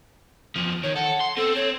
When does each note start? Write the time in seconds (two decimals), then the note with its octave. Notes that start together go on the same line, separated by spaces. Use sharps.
0.56 E2 F3
0.83 D#3 C#5
0.96 A4 F#5
1.20 C6
1.37 C4 A4 C5
1.56 C#5